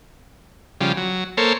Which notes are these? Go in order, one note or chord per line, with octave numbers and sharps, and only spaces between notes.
C#3 F3 G3
F#3
A#3 A4 C5 C#5